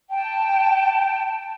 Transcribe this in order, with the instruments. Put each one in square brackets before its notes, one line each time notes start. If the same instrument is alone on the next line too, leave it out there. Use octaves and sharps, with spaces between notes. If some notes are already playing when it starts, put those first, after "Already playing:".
[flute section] G5 A5